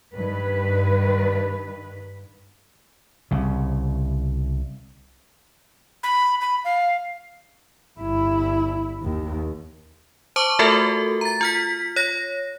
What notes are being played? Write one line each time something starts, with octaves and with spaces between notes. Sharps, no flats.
G2 D#3 B4
C2 C#3
B5
B5
F5
G1 E4
D#2
C5 A5 C#6 D6
A3 F4 F#4 A4 A#4 E5
A#5 A6
F4 F6 B6
C#5 A#6